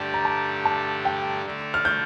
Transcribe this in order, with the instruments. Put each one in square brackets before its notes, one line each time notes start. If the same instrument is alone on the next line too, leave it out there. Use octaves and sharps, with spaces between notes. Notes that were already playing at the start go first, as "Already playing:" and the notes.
Already playing: [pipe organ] G2 D3 A3 D4 G4 [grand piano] A5
[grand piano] A#5
A5
A5
G5
[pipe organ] D3 A3 D4
[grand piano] F6
G6